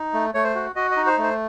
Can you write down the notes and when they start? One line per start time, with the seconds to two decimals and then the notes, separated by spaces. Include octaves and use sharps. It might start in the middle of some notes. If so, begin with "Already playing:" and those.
Already playing: D#4
0.14 A3
0.34 A3 C#5
0.44 C5
0.55 F#4
0.76 F#4 D#5
0.91 D#5
0.97 D#4
1.07 C5
1.18 A3
1.23 C5